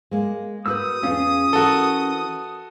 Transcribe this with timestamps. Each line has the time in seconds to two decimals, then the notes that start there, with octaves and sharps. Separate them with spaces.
0.11 G#3 A#3
0.66 A#3 F#4 B4 D#6 E6 G6
1.03 E2 C#4 F4 G#4 G#5
1.53 E3 F#4 A4 A#4